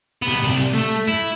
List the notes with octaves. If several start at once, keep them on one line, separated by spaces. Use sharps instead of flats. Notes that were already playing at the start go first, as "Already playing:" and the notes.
C3 B3
C3 D5
A3
E4